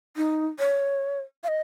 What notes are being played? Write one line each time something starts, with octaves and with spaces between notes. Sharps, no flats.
D#4
C#5
F5
D#5